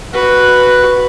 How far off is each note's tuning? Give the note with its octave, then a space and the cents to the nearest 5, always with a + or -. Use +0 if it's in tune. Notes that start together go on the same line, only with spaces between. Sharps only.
F#4 +0 B4 +0